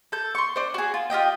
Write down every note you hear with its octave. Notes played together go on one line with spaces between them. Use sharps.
A4 G6
C6 C#6
D4 C5
F#4 G#4
F4
F4 G4 D#5 G5